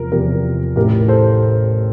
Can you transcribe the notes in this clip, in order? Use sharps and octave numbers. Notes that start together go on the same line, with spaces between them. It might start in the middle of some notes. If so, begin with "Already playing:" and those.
Already playing: E2 C3 F3 A#4
E2 C3 F3 G4 A#4
A1 A2 E3 G4 A#4
A4 C5